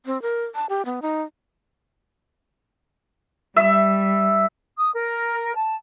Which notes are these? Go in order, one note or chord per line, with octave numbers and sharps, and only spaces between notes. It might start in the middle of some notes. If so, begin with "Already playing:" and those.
C4
A#4
A5
G4
B3
D#4
G3 E5
D#6
A#4
A5